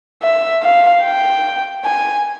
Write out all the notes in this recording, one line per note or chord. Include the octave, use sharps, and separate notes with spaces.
E5
F5
G5
G#5